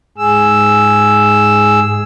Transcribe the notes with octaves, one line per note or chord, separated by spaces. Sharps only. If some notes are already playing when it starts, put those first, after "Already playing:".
G#2 G#4 E6